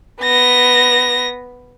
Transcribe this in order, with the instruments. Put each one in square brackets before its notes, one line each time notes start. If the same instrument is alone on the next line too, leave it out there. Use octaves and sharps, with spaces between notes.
[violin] B3 A#6